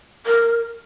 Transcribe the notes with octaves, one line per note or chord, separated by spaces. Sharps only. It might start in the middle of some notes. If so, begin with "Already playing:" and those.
A#4